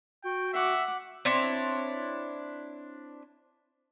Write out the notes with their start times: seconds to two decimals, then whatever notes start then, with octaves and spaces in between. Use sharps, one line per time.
0.24 F#4 G5
0.53 E5 F#5 D6
1.25 C4 D4 E4 C#5